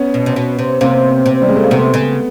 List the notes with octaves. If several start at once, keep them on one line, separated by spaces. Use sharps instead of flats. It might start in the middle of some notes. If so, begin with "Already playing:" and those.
Already playing: B3 C#4
B2
C3
B2
C3
C3 A#3 C4
C3
G3
G#3
A3
A#3
C3 A3 B3
C#3